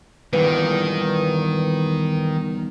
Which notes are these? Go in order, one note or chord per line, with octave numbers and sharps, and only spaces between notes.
E2 G2 A#2 D#3 B4